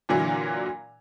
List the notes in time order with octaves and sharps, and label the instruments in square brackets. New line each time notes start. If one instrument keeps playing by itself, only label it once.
[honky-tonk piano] A#2 D3 E3 F#3